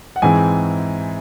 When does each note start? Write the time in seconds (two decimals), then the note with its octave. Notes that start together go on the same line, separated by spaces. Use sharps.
0.16 F#5
0.22 G#2 E3 C4 G#5